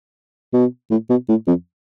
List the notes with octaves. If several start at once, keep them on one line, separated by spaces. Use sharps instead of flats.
B2
A2
B2
A2
F2